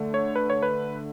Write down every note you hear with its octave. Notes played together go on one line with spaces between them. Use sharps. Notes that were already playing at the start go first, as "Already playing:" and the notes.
Already playing: D3 A3
C#5
B4
C#5
B4